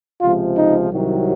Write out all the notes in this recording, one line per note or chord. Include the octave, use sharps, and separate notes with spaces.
C#2 C3 F3 G#3 F4
D#4
C2 C3 D#3 F#3